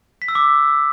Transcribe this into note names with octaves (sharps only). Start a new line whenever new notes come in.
B6
E6
D6